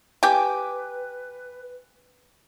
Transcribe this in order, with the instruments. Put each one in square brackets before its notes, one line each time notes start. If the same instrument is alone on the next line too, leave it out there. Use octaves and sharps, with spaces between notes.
[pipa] G4 G5 [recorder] B4 [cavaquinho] G#5 D6